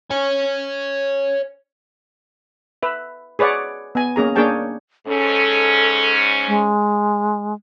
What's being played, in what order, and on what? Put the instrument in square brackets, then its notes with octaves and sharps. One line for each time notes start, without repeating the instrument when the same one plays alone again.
[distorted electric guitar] C#5 G#5
[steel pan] B4 E5
G#4 B4 C#5 D5 F#5
B3 G#5
A#3 C#4 G#4 A#5
A#3 D4 G#4 C#5 G5 A5
[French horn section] G#2 C#4 [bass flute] A4
[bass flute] G#3